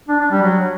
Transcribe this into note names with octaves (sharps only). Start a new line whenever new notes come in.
D4
D4
G3
F#3